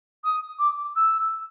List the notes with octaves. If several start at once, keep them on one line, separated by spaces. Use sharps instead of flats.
D#6
D6
E6